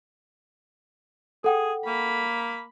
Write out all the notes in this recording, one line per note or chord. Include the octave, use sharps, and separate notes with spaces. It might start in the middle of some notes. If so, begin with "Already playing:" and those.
G#4 A4 F#5 G5
A#3 B5